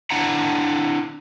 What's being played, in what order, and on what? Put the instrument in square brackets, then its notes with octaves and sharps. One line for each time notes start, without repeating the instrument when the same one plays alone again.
[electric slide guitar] D4 E4 F#5 A#5